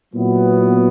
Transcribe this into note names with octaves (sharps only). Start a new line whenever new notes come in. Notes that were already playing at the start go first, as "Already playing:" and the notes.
A#2 F#3 B3 E4